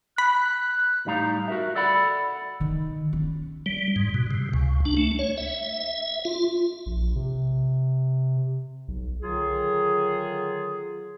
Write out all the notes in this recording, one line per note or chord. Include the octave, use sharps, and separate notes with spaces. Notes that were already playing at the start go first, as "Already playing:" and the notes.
B5 F#6
A2 G3 D#4 F5 A#5
F#4 A#4 E5
A4 D5 F#5 B5
D#3
C#4
G3
G#2
B2
C3
C#2
D4
A3
C#5
E5
F4
A#1
C3
B1
D3 D#3 F#3 F4 G#4